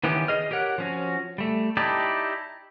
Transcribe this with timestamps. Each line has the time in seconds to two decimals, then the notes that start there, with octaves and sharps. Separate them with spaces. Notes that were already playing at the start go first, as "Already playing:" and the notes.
0.04 D#3 E3 B3 C#4 G4
0.28 G#4 D#5 F6
0.51 G4 A#4 C#5 F#5
0.78 F3 C#4 F#4
1.38 G3 A3
1.77 D#4 E4 G4 D5 A5